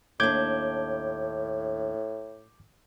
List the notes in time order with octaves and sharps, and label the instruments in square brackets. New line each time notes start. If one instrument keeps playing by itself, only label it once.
[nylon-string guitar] D#2 D4 [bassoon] A2 [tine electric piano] D6 G6 G#6